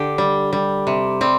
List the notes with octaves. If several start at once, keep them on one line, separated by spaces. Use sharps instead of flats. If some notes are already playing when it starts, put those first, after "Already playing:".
Already playing: D3 G4
G3
G3
C3
G3 C4